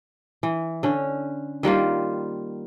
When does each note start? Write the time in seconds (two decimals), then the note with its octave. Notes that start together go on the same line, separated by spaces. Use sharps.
0.43 E3
0.83 D3 C#4
1.63 D#3 G3 A#3 F4